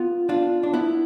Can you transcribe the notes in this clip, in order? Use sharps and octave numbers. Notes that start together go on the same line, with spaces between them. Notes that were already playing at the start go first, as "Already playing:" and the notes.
Already playing: B3 F4
D4 F4
D4
B3 E4